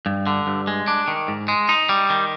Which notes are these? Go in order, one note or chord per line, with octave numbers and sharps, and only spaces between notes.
G2
D3
G2
G#3
D4
D#3
G#2
G#3
D#4
G3
D#3